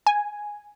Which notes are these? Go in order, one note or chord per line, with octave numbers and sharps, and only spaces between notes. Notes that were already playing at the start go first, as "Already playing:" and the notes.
G#5